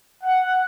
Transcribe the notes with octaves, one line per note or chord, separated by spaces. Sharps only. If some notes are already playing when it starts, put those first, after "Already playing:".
F#5